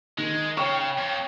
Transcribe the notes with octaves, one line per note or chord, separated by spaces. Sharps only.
D#3 G#3
C#3 C#5 G5 C#6 F6
F2